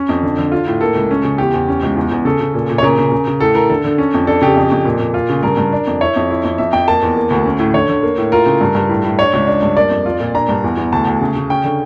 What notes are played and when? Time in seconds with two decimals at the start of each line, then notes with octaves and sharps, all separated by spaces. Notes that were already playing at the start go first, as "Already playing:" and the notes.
Already playing: C#4
0.09 F2
0.23 D3
0.38 D3
0.52 F4
0.67 A2
0.81 A#3 A4
0.95 C#2
1.11 C#4
1.24 C#3
1.38 E2 G4
1.54 E2
1.68 C#4
1.83 C#2
1.96 E2
2.12 E2
2.25 C#3 A4
2.41 C#3
2.54 A#2
2.69 A#2
2.78 C#5
2.83 C#3 A#4
2.98 C#3
3.12 C#3
3.27 C#3
3.40 A2 A4
3.55 A2 A#4
3.70 D3 A4
3.84 D3
3.98 C#4
4.14 F2
4.27 D4 A4
4.42 C#3 G4
4.56 F2
4.72 F2
4.85 A#2
5.00 A#2
5.14 F4
5.29 C#3
5.43 G2 A#4
5.57 G2
5.72 D4
5.87 F2
6.01 E4 C#5
6.16 F2
6.31 E4
6.44 F2
6.58 F2 E5
6.73 F2 G5
6.88 A#3 A5
7.02 E2
7.16 A#3
7.30 D2
7.46 C#4
7.59 A2
7.74 D3 C#5
7.89 D3
8.03 A#3
8.18 A2
8.32 F4 A#4
8.46 C#3
8.61 G2
8.75 G2
8.89 A2
9.05 A2
9.19 D4 C#5
9.33 C#2
9.47 D4
9.63 G2
9.77 A#3 D5
9.90 F2
10.06 F4
10.20 A#2
10.34 D4 A#5
10.49 G2
10.64 E2
10.77 E2
10.92 D2 A5
11.07 D2
11.21 C#3
11.36 C#3
11.50 C#4 G5
11.64 D3